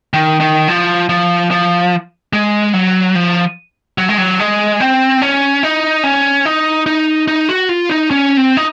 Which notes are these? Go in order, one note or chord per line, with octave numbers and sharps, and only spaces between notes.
D#3
D#3
F3
F3
F3
G#3
F#3
F3
F#3
G#3
F#3
G#3
C4
C#4
D#4
C#4
D#4
D#4
D#4
F#4
F4
D#4
C#4
C4
D#4